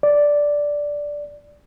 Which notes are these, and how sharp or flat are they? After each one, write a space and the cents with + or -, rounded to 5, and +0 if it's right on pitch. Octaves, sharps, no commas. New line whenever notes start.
D5 -5